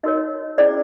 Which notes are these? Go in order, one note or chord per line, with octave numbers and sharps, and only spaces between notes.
D#4 F#4 A#4 C#5 D#5
C#4 E4 G#4 C5 D5